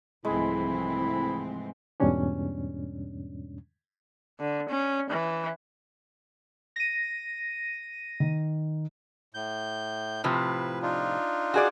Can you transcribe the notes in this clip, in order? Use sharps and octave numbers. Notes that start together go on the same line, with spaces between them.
C2 G#2 E3 F3 G#3 A3 C4 E4
E2 G#2 B2 G3 C#4 D4
D3
C#4
E3
A#6 D#7
D#3
A2 G6
A2 C3 F3 B4
D4 D#4 F4
F#4 G#4 D5